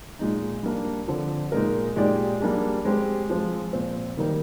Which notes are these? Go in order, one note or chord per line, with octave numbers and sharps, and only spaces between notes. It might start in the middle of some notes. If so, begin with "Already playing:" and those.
A#2 G#3 D#4
G3 A#3 D4
D3 F3 C4
A#2 G#3 D#4 A#4
A#2 G#3 D#4 G4 D5
G3 A#3 D4 G#4
G#3 C4 G4 C5
F3 G#3 C4 F4
A#2 F3 C4
D#3 G3 A#3 D#4 A#4